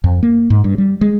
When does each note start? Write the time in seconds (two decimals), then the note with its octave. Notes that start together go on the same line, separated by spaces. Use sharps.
0.04 F2
0.23 A#3
0.50 G#2
0.64 G2
0.78 G3
1.01 G#3